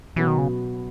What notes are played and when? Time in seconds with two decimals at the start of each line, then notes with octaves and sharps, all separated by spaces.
0.16 B2 E3 F#3 B3 F#4
0.27 D#3
0.38 C#3